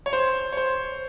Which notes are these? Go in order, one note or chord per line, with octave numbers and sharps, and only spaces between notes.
C#5
C5
C#5
C5